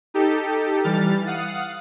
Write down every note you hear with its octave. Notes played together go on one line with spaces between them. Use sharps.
D#4 G4 A4
E3 G3 F6 A6
F5 F#5 D#6